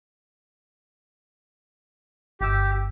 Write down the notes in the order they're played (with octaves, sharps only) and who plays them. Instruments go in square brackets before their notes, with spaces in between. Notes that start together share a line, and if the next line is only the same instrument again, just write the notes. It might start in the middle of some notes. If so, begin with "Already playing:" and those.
[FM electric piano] G1 E6 [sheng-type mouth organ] G4